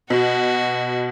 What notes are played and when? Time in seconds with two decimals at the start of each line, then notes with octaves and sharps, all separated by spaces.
0.10 B2 F#4